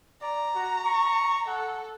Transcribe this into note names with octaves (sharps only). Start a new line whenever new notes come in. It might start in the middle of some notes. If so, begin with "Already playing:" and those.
D5 A#5
F#4
C#6
A4 F#5